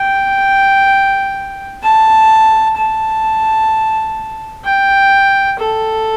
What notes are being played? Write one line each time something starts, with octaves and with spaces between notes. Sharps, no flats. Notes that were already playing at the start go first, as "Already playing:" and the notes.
Already playing: G5
A5
A5
G5
A4